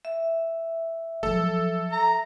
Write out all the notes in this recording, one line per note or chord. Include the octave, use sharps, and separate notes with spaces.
E5
F3 F#3 A4
A#5